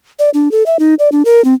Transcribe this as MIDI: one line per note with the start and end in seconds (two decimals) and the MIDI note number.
0.19 0.30 74
0.34 0.51 62
0.51 0.63 69
0.66 0.77 76
0.79 0.94 63
0.99 1.09 74
1.12 1.23 62
1.25 1.44 70
1.45 1.54 60